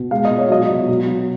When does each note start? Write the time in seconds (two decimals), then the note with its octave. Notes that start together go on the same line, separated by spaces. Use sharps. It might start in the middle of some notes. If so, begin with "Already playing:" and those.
Already playing: B2
0.11 G#3 F5
0.25 D#5
0.31 A#2
0.38 C#5
0.50 F#3 D#5
0.69 B2
0.88 F#3
1.08 B2